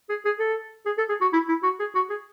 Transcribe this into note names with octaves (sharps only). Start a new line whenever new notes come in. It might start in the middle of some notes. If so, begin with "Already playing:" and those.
G#4
G#4
A4
G#4
A4
G#4
F#4
E4
E4
F#4
G#4
F#4
G#4